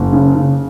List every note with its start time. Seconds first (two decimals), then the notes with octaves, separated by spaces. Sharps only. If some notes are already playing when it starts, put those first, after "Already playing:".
Already playing: F#1
0.12 C#3
0.35 C#3